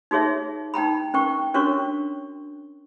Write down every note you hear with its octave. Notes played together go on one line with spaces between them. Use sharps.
D#4 F#4 G#4 C#5 E5
D#4 G5 A#5 B5
C#4 A#4 G5 C#6
C#4 D4 F#4 A#4 C#5 C#6